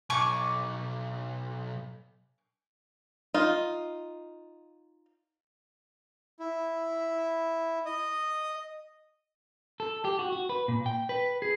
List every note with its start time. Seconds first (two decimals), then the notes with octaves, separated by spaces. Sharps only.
0.10 B1 G#5 C#6 D6
3.34 D#4 F4
6.40 E4
7.85 D#5
9.80 A4
10.05 G4
10.19 F#4
10.32 F#4
10.49 B4
10.68 A#2
10.86 G5
11.09 B4
11.42 G#4